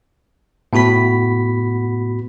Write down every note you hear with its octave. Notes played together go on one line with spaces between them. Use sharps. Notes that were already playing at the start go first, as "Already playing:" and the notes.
A2 B3 F#4 B5 B6